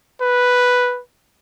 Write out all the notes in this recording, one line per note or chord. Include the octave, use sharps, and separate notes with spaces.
B4